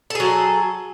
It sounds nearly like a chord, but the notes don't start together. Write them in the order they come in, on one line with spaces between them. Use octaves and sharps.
A4 G#4 F#3